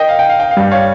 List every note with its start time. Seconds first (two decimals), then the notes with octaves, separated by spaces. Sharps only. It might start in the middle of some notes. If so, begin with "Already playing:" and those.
Already playing: A#4 D#5 G5
0.09 F5
0.19 G5
0.29 F5
0.40 G5
0.51 F5
0.57 G2 G3 G5
0.71 C#5 F5